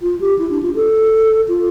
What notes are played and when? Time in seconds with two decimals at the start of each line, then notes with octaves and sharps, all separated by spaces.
0.02 F4
0.21 G4
0.39 E4
0.50 D4
0.63 F4
0.75 A4
1.48 F4